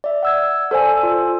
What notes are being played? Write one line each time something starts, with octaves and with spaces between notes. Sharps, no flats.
D5 E5
F#5 E6 G#6
A4 C5 D5 G#5
F4